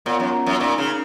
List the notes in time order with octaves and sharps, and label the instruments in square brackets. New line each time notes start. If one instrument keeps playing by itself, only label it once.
[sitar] A#2 [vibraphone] B3 F4 A#4 C#5 F#5
[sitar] F#2
F#2
[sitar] A#2 [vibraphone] A#3 D#4 A#4
[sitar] C#3